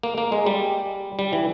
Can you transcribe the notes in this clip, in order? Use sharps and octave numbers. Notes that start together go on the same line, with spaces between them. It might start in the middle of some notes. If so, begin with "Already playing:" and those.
A#3
A#3
G#3
G3
G3
E3